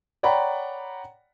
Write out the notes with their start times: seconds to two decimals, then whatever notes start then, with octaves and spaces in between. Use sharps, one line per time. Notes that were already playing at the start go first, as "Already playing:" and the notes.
0.23 C#5 D5 F#5 G5 A#5 B5